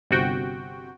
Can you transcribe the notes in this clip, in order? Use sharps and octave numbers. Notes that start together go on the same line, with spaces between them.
G1 C3 F#4 G5